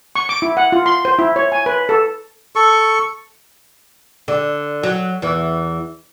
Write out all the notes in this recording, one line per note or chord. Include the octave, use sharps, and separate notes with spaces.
C#6
D6
E4
F#5
F4
C6
C5
E4
C#5
G#5
B4
A4
A4 C#6
D3
F#3
E2 E3